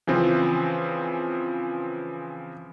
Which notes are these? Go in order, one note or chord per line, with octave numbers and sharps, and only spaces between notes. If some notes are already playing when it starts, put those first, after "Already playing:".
C#3 E3 F3 C4